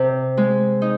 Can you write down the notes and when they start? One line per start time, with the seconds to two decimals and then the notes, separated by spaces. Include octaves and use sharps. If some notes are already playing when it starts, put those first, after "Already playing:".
Already playing: C3
0.37 G#3
0.82 D#4